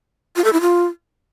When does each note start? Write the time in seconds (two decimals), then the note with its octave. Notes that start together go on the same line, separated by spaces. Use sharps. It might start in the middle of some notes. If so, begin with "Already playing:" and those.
0.36 F4
0.44 A4
0.53 E4
0.61 F4